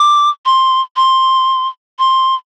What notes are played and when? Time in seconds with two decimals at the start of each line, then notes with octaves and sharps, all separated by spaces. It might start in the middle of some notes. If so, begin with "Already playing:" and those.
Already playing: D6
0.46 C6
0.96 C6
1.99 C6